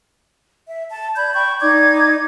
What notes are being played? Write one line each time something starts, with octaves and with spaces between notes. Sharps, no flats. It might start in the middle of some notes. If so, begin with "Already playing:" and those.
E5
A5
D5 B5 G6 G#6
G5 B5 C#6 G6
D#4 D5 D6 G#6